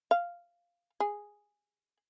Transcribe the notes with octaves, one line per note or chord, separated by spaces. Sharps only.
F5
G#4